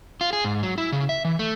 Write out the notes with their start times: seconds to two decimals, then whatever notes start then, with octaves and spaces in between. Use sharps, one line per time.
0.21 F4
0.33 G#4
0.44 G#2
0.63 F#3
0.78 E4
0.92 C#3
1.09 E5
1.25 E3
1.39 A3